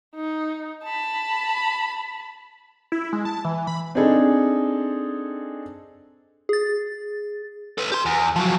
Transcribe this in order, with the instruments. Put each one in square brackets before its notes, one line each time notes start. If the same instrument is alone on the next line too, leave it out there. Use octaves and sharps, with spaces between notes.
[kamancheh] D#4
A5 B5
[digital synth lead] E4
G#3
A5
E3
B5
[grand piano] C4 D4 D#4 G#4 A4
[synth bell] G#4 A6
[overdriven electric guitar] A4 B4
G4 C6
E2
F3 F#3